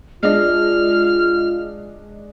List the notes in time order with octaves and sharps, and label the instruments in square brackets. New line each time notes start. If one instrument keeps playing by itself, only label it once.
[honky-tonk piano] G#3 D4 D#5 [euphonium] F4 [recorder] F6